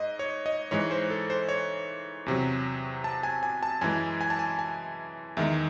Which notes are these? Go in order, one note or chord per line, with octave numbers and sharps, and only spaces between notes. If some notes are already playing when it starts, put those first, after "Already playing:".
Already playing: G#2 D#5
C#5
D#5
G#2 E3 G#3 C#5
C5
A4
C5
C#5
E2 C3 F#3
A5
G#5
G#5
A5
F#2 E3 G#3 G#5
G#5
A5
G#5
G#5
E2 D#3 G#3 E5